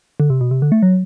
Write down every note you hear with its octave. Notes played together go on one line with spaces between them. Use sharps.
D3
C3
B2
C3
D3
A3
F#3